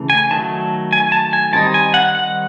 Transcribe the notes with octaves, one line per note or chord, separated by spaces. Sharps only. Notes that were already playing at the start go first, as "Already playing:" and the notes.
Already playing: C#3 E3 A3
G#5
D#3 F#3 A3 A5
G#5
A5
G#5
D#3 G3 C4 D#4 A5
G#5
F#5
F#5